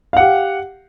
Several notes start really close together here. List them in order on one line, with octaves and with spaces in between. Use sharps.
F5 F#5 G4